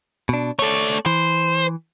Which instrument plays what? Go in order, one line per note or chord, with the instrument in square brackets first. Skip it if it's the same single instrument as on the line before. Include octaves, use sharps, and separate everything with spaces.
[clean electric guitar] B2 D4
[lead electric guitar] A3 D5 [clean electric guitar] A4 C#5
[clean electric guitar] E3 [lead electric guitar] C5